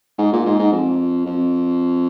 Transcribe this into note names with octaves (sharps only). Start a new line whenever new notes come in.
G#2
A#2
G#2
G#2
F2
F2